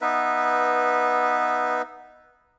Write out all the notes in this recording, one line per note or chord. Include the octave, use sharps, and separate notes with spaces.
B3 D#4 B4 E5